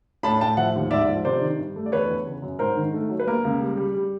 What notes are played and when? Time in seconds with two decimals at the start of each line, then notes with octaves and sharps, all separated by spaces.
0.23 A2 A5 B5
0.41 A2 G5 A5
0.57 F3 E5 F#5
0.75 D#2
0.91 G#2 D5 E5
1.08 F3
1.25 C3 C5 D5
1.41 D#3
1.58 G2
1.76 A3
1.86 D5
1.92 E2 B4 C#5
2.09 E2
2.27 C#3
2.42 F#2
2.59 G#2 A#4 C5
2.77 D#3
2.94 A3
3.10 F#3
3.20 B4
3.27 A#3 A#4
3.44 C#2
3.60 G3
3.77 G3
3.95 G3